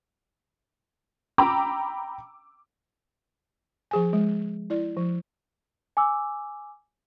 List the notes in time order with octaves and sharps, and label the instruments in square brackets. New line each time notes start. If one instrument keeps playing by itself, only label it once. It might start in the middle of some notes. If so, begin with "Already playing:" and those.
[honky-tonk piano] G5 A#5 B5 D6 E6
[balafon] F3 G#4 G#5
G#3
E4 D5
F3
[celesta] G#5 D6 E6